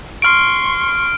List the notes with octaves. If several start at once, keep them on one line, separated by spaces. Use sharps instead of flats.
C6 C#6 F6 D7